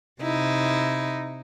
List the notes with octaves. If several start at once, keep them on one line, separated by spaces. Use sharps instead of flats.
C3 D#4 E4